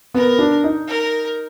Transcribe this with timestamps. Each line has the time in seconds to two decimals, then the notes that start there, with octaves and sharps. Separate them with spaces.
0.14 B3 A#4
0.39 D4
0.64 D#4
0.88 A#4